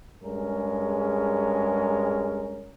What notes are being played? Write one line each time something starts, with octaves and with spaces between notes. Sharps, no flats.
G2 G#3 C#4 G#4 A#4